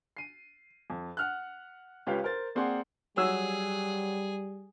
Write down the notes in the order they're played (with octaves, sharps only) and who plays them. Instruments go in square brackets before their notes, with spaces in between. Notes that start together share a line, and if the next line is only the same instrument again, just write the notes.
[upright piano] C7 D#7
F2
F#5 F6 F#6
C#2 F4 G4 B4 C#5 F5
A#4 C5 A6
A#3 C4 G#4 D5 F#5 C6
[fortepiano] F#3 E6 [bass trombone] G3 [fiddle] G#4